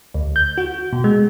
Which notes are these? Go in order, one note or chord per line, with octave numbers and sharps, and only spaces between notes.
D2
G6
F#4
B2
G#3